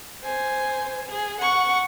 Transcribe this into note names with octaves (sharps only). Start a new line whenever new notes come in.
C5 G#5
G#4
F#5 C#6